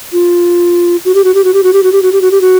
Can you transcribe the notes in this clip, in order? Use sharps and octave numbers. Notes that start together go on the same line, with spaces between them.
F4
F#4
G4
F#4
G4
F#4
G4
F#4
G4
F#4
G4
F#4
G4
F#4
G4
F#4